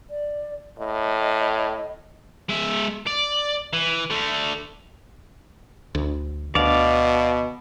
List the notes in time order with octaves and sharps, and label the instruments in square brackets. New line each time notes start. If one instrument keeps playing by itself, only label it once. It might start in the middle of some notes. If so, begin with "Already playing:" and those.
[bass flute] D5
[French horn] A2 [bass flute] D#5
[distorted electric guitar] G#3 E5
D5
E3
D3 A3
[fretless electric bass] D2
[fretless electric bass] D2 [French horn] B2 [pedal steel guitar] D5 F5